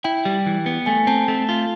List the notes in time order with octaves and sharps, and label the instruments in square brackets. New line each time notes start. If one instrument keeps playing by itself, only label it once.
[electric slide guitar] E4 [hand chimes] G5
[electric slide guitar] G3
E3
B3
[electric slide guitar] A3 [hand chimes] G#5
[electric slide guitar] C4 [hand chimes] A5
[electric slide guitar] A3
F4